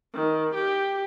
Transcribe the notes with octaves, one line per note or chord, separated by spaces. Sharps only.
D#3
G4